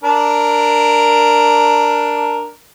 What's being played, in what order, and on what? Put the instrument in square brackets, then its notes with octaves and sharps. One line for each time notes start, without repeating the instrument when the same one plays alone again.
[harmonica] D4 A#4